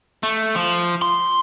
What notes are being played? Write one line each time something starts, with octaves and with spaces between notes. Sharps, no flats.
A3
F3
C6